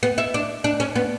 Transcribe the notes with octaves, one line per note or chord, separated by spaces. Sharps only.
B3
E4
D4
D4
C#4
B3